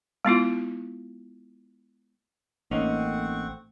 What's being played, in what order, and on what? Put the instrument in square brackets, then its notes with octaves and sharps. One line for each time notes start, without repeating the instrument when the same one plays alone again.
[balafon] G#3 B3 E4 F4
[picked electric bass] A1 [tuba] A3 [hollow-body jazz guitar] A#3 C#4 D#4 [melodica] C4 F#5 C#6